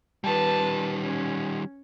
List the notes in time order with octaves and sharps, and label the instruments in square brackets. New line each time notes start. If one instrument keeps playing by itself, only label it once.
[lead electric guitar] D#3 G3 [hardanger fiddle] B4 A5
[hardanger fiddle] C#4